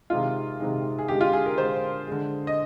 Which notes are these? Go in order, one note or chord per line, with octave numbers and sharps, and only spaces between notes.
C3 D#3 G#3 F4
C3 D#3 G#3
G#4
D3 G#3 G4
F4
G#4
A#4
D3 G#3 C5
D3 G#3
D#5